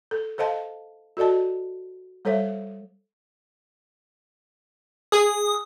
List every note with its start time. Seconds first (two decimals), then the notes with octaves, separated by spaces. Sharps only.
0.11 A4
0.38 A4 C5 D#5 F5 A5
1.17 F#4 A4 D5 D#5 A5
2.25 G3 A4 C5 C#5 E5
5.12 G#4 D#6